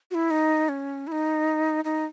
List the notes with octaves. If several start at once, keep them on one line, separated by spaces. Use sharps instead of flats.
F#4
E4
D#4
C#4
E4
D#4
D#4